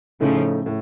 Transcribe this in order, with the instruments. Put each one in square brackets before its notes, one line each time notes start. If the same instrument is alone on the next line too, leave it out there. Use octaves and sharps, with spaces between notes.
[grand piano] A2 A3 D#4 [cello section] C#3 F3
[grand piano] A2